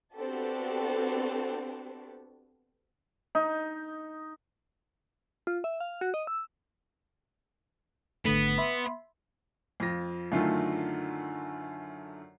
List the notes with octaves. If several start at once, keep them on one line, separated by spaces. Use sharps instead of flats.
B3 C4 D4 F#4 G4 A4
D#4
F4
E5
F5
F#4
D#5
E6
G#1 D3 A3 B3
E5 B5 C6
F2 F4 A#6
F#2 D3 D#3 A3 F4